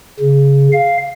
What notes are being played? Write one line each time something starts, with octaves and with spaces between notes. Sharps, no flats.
C#3
F5